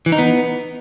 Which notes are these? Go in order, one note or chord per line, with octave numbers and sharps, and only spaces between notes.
E3
D#4
B3